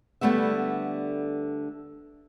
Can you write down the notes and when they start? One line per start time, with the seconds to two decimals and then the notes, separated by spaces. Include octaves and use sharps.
0.21 D3 G3 A3 B3 E5